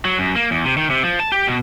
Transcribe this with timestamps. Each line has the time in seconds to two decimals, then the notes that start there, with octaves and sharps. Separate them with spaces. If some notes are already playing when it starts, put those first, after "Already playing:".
0.05 F#3
0.19 F#2
0.36 A#3
0.51 E2
0.65 C3
0.77 D#3
0.90 C3
1.04 F3
1.20 A5
1.32 G4
1.47 B2